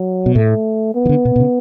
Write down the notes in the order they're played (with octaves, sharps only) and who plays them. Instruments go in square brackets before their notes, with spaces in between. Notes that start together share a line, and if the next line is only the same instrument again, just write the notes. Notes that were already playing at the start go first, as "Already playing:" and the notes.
Already playing: [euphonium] F#3
[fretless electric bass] B2
[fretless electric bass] A2 [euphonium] A3
[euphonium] B3
[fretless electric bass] E3
D3
B2
B2
C#3